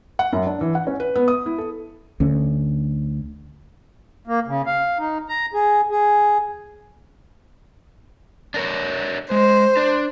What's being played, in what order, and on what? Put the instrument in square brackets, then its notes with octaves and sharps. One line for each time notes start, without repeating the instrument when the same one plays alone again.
[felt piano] F#5
F#2
D4
E3
F#5
C#4
B4
B3
D#6
E4
A4
[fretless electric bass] D2 D3 C#4
[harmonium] A#3
C#3
F5
D#4
A#5
G#4
G#4
[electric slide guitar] D4 A#4 C#5
[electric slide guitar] G#3 [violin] C5
[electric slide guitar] D4